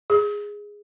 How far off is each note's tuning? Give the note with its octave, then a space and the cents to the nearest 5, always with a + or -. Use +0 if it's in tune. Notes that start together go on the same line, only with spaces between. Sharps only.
G#4 -10